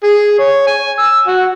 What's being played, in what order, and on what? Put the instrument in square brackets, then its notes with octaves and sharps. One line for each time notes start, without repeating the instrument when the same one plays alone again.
[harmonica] G#4
C#5
G#5
E6
F#4